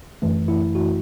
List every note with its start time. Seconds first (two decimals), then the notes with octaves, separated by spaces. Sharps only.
0.22 F#2 E3 A3
0.48 E4
0.75 F#4